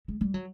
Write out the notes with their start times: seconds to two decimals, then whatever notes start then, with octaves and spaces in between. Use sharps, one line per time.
0.08 G#3
0.21 G3
0.34 F#3